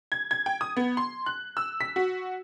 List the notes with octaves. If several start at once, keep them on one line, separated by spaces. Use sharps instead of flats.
G#6
G#6
G5
D#6
B3
C6
F#6
E6
B6
F#4